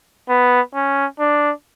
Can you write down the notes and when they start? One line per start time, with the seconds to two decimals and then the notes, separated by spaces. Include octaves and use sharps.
0.29 B3
0.75 C#4
1.19 D4